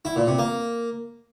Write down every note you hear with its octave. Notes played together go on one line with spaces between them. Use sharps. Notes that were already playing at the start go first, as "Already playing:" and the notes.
E4
A#2
C3
A#3